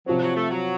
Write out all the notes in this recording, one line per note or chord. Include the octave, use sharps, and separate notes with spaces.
C3 F3 F#3 C4
F#3
A3
F#3